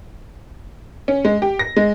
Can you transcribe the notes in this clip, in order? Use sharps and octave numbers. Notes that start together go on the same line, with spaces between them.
C#4
G#3
G4
A#6
G#3